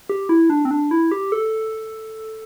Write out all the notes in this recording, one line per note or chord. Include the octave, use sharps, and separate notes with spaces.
G4
E4
D4
C4
D4
E4
G4
A4